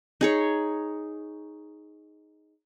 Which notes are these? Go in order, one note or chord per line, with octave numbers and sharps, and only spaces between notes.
D#4 G#4 C#5